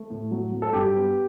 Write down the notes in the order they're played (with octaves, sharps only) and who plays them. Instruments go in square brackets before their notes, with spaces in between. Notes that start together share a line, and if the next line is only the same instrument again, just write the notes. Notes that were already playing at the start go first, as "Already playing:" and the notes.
Already playing: [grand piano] A3
A2
F#3
F#3
A4
G2 G4
B3